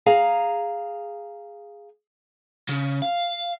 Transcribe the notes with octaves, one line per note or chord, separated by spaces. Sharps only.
G#4 F5 A#5
C#3
F5